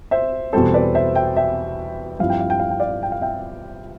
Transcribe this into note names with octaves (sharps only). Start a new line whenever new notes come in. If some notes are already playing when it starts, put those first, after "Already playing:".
C5 E5
E2 B2 G3 C4 A4 C5
B4 D5
C5 E5
E5 G5
E5 G5
G2 F3 C4 E4 F5
G5
F5
G5
F5
G5
D5 F5
G5
F5
E5 G5